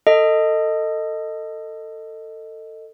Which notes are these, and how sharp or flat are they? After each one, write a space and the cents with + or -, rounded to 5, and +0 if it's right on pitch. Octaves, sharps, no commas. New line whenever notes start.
A4 +25 D#5 +0